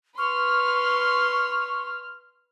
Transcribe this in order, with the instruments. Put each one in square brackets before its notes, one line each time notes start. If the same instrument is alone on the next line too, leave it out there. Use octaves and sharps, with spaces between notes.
[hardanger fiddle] B4 C6 [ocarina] C#6 [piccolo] F6